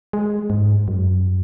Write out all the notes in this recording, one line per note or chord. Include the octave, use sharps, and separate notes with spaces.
G#3
G#2
F#2